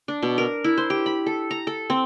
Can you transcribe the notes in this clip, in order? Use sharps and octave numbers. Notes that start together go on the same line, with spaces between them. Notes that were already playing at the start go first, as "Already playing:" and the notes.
D4
B2
A#4
E4
C5
G4
B5
A4
A#5
A4
C4